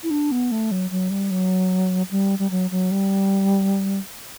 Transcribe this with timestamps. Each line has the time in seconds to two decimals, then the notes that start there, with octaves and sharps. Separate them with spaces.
0.03 E4
0.10 D4
0.31 B3
0.51 A3
0.71 F#3
0.91 F#3
1.10 G3
1.31 F#3
2.11 G3
2.39 G3
2.51 F#3
2.71 F#3
2.91 G3